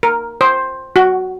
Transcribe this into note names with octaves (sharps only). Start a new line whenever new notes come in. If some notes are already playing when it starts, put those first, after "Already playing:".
A#4
C5
F#4